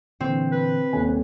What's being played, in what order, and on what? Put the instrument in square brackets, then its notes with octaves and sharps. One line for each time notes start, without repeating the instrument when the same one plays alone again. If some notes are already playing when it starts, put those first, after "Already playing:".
[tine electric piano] A#2 D3 E3 [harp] C4
[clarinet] B4
[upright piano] D#1 C2 G#5 [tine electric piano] D#3